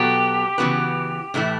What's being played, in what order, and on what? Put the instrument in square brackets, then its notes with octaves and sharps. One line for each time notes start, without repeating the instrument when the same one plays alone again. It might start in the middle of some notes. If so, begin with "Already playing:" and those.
Already playing: [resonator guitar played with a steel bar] B2 F#3 B3 F#4 A4 [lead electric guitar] G4
[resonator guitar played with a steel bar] C#3 E3 B3 F#4 B4
A2 E3 A3 E4